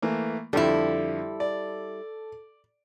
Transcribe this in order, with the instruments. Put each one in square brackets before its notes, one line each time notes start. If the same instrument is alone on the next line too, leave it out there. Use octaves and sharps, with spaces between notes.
[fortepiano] E3 A3 A#3
[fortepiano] F2 D3 [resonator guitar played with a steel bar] G3 E4 [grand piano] A4
[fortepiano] D5